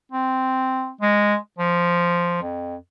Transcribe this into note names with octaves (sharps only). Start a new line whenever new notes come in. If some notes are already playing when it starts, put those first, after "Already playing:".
C4
G#3
F3
F2